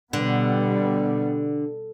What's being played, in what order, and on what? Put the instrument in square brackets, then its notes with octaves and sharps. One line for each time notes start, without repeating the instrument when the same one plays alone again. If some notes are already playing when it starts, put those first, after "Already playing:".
[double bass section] B2 G3 B3 [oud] D3